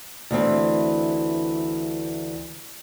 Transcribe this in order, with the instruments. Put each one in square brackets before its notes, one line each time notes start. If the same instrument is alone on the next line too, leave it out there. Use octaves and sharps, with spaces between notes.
[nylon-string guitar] D2 E3 C4